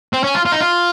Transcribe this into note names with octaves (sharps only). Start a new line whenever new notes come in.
C4
C#4
F4
F4
D#4
F4